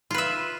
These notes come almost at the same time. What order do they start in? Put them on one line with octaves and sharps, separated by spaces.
F4 B4 E5